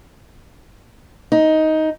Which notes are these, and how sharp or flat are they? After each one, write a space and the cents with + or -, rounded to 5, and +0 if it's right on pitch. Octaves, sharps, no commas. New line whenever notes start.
D#4 +10